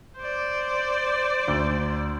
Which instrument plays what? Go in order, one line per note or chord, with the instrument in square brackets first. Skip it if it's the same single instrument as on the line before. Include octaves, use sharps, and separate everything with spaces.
[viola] C5 D5
[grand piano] D2